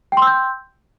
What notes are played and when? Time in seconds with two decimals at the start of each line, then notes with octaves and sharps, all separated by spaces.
0.12 G5
0.17 C6
0.22 E6
0.27 G6